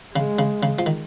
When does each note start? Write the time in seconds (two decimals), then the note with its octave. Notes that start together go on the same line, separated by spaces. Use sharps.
0.16 C#3 G#3
0.39 C#3
0.63 C#3
0.79 F3
0.86 D#3